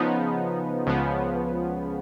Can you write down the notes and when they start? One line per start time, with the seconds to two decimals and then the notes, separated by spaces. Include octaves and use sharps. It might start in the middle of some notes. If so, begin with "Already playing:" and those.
Already playing: C#3 F3 B3 D#4
0.86 C#2 C#3 F3 B3